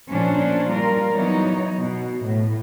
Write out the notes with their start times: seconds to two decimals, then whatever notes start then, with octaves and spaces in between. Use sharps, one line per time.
0.10 A#2 F3 C#4 D4 C5
0.71 G3 F4 A#4 D5
1.13 E3 F#3 B3 D#4 C#5
1.80 B2 B3
2.25 A2